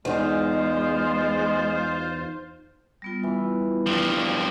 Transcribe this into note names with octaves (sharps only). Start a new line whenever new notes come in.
E2 G#3 D#4 F4 C5
G3 B3 F4
E3
G2 F3